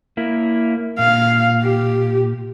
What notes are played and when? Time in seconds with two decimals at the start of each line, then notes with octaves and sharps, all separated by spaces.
0.17 A#3 E4
0.99 A#2 F5
1.62 G4